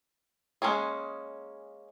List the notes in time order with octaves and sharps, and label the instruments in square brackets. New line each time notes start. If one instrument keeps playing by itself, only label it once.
[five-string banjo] G#3 A#3 C#4 G#4